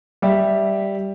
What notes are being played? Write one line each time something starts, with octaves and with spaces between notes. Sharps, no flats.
G3 G4 E5